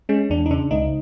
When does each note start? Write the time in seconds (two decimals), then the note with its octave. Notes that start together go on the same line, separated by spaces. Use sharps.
0.09 G#3 C#4
0.30 E2 D4
0.46 D#4
0.51 C#3 D4
0.71 C#2 D#4